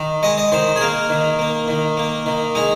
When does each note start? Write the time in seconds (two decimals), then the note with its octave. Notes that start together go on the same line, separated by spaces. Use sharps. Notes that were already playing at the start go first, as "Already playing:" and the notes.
Already playing: D#3
0.23 G#3 D#5
0.38 D#5
0.52 D#3 C5
0.76 G#4
0.81 A#3 A#4
1.10 D#3
1.39 A#3
1.68 D#3
1.97 A#3
2.26 D#3
2.55 G#3 D#4